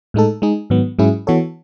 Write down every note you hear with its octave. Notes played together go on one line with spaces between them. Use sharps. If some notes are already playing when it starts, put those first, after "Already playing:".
A2 G#3 D#4 A4
G#3 D#4 G#4
G#2 D#3 F#3 B3
G#2 F#3 C#4 E4 G#4
E3 B3 F#4 A4 C#5